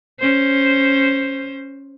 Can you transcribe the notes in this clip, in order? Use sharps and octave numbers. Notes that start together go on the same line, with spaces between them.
C#4 C5